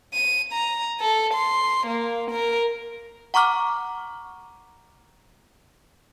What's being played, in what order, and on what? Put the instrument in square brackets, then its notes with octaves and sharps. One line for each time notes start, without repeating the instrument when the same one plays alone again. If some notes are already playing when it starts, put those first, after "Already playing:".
[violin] D#7
A#5
A4
C6
A#3
A#4
[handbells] F#5 A#5 C#6 D6 F6